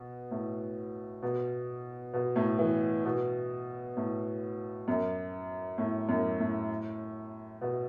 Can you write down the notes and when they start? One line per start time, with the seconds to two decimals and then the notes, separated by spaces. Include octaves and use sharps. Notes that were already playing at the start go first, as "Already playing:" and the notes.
Already playing: B2
0.31 A2
1.22 B2
2.14 B2
2.36 A2
2.59 E3
3.05 B2
3.97 A2
4.88 F#2
5.78 A2
6.09 F#2
6.40 A2
7.61 B2